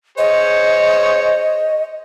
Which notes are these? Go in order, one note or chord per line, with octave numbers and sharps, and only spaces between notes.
G#4 C5 C#5 D#5